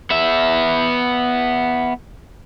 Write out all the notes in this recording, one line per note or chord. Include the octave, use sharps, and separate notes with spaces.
B3 E5